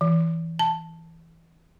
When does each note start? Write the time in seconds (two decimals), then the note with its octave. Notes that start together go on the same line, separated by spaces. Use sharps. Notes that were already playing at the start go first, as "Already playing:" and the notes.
0.01 E3
0.59 A5